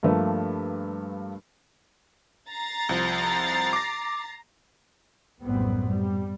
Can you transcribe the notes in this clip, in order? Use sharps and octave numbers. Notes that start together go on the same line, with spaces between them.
G2 F3 A3 A#3 B4
A#5 A6 C7
C2 F3
D6 A#6
A#1 F#2 A2 G3 B3 C4
G3